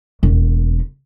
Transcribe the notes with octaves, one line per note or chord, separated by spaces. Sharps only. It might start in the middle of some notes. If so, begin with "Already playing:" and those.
E1 D#2